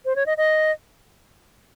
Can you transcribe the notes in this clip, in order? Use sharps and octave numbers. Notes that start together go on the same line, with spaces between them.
C5
C#5
D#5
D#5